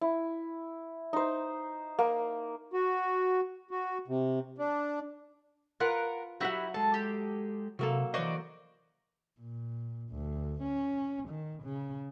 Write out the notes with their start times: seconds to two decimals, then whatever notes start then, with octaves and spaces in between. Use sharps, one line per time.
0.01 E4
1.13 D#4 C5
1.99 A#3
2.74 F#4
3.71 F#4
4.08 C3
4.58 D4
5.80 F4 A#4 B4 F#5
6.40 F#3 E4 F#4 G4 E5 F#5
6.74 G#3 A4 A5
6.94 G4
7.79 C3 F#3 A#3 A4
8.14 E3 F#4 C5 D5 D#5
9.40 A#2
10.10 D2
10.63 C#4
11.29 D#3
11.64 C#3